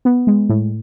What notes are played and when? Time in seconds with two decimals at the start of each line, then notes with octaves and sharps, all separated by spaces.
0.05 B3
0.27 G#3
0.49 A2